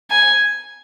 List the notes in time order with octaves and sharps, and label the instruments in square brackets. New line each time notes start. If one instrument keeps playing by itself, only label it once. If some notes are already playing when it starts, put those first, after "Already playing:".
[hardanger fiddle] G#5